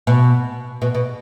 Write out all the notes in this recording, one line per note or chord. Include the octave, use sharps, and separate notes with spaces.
B2
B2
B2